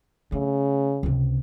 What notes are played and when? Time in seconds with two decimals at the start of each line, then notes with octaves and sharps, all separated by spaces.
0.32 C#3 A3
1.03 C#2 C3